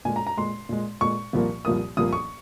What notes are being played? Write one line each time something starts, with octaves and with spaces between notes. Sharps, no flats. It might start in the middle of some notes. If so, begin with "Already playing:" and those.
A#2 G#3 G#5
A#5
A#5
A#2 G#3 C6
A#2 G#3
A#2 G#3 C#6
C2 A#2 F3 A#3
C2 A#2 F3 A#3 D#6
C2 A#2 F3 A#3 D#6
C#6